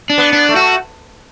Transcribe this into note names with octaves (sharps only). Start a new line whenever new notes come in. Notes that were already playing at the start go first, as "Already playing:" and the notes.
D4
B3
D4
A3
F#4